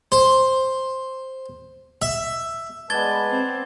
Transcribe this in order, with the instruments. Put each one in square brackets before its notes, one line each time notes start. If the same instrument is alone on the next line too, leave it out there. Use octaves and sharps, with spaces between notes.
[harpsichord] C5
E5
[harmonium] G#3 B4 A5 [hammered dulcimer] B3 D5 [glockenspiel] G#6 A6 G7
[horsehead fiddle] C4